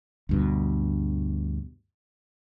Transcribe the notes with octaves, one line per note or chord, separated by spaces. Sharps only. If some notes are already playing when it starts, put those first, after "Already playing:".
D2 G2 B2